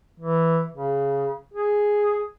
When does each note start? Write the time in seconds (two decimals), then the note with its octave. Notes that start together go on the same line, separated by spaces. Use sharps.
0.20 E3
0.74 C#3
1.54 G#4